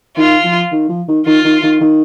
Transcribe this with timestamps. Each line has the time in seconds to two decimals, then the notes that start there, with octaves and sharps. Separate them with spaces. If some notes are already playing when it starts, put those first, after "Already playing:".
0.17 D#3 F4
0.44 F3
0.72 D#3
0.89 F3
1.08 D#3
1.26 D#3 F4
1.45 D#3
1.63 D#3
1.81 D#3